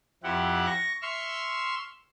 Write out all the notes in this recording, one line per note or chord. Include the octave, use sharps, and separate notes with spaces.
F2 C4 E4 G4 F#5
C#6 A#6
E5 C6 C#6 E6 F6